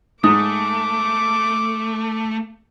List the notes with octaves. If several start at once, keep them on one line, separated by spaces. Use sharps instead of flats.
G#2 A3 D6 D#6